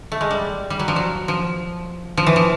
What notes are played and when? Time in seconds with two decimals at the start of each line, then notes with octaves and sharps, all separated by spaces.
0.12 A3
0.21 G#3
0.31 G3
0.70 G3
0.79 F#3
0.88 F3
0.96 F#3
1.28 F3
2.17 F3
2.27 E3
2.36 F3